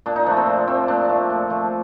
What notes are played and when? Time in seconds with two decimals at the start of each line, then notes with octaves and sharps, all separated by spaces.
0.06 A#2 D4
0.16 D#4
0.26 F3 A3 D4
0.37 C4
0.46 A#2
0.67 F3 A3 C4
0.88 A#2 D4
1.09 F3 A3
1.30 A#2
1.50 F3 A3